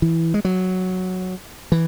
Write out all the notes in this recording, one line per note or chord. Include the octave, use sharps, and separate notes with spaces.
E3
G#3
F#3
E3